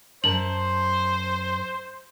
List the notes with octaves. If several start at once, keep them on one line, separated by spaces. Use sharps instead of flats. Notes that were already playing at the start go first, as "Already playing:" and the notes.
F#2 C5 A5 F#7